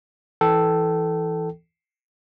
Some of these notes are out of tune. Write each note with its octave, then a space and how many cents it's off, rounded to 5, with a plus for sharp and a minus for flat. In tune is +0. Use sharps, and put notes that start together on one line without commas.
E3 +0 A4 +0 G5 -20